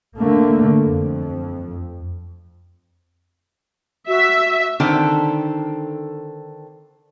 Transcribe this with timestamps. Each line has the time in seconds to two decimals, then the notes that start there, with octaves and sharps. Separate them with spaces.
0.16 D3 A3 A#3
0.84 F2
4.08 F#4 E5
4.80 D3 D#3 C4 A4